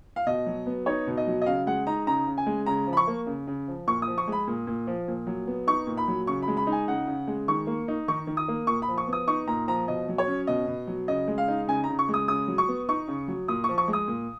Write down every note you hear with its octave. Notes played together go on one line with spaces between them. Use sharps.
F5
B2 D#5
F#3
B3
D#4 C#5
B2
D#5
F#3
D#5
C#3 F5
G#3 F#5
D#4 A#5
C#3 A#5
C#3
G#5
G#3
C#3 A#5
F3
B5
C#6
A#3
C#3
C#3
F3
A#2 C#6
D#6
F3
C#6
G#3 B5
A#2
A#2
F3
A#2
F#3
B3
D#4 C#6
A#2
B5
F#3
C#3 C#6
B5
G#3
B5
D#4
G#5
C#3 F#5
C#3
G#3
D#3 C#6
A#3
D#4
D#3 C#6
D#3
D#6
A#3
A#2 C#6
B5
F3
C#6
B3
D#6
D#4 C#6
A#2 A#5
F3 A#5
B2 D#5
F#3
C#5
C#4
B2 D#5
B2
F#3
C#3 D#5
G#3
F5
D#4
C#3 G#5
C#3 A#5
C#6
G#3
D#6
C#3 D#6
F#3
C#6
B3
D#4 C#6
C#3
F#3
A#2 D#6
C#6
F3
C#6
G#3
D#6
A#2